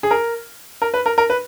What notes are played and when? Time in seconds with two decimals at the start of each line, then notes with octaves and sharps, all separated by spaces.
0.03 G#4
0.11 A#4
0.82 A#4
0.94 B4
1.06 A#4
1.18 A#4
1.30 B4